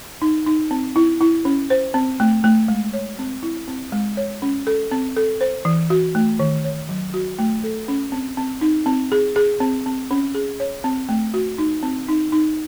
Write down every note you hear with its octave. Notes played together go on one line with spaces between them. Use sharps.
D#4
D#4
C4
E4
E4
C#4
C5
C4
A3
A3
G#3
C#5
C4
E4
C4
G#3
C#5
C#4
A4
C4
A4
C5
E3
F#4
A3
D#3
C#5
F#3
F#4
A3
A4
C#4
C4
C4
D#4
C4
G#4
G#4
C4
C4
C#4
G#4
C#5
C4
A3
F#4
D#4
C4
D#4
D#4